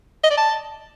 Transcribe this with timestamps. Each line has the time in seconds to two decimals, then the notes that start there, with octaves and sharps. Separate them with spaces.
0.24 D#5
0.31 D5
0.37 A5